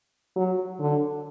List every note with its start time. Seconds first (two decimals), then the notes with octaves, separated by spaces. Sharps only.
0.36 F#3
0.80 D3